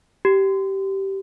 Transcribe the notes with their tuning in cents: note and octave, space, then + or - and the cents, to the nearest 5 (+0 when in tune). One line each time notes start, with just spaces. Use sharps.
G4 -15